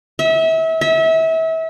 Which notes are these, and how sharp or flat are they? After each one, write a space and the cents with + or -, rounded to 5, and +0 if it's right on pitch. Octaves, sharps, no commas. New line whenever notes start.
E5 -30
E5 -30